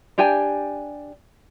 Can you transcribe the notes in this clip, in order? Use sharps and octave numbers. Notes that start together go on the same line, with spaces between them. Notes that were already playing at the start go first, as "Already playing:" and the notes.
D4 G4 G5 G#5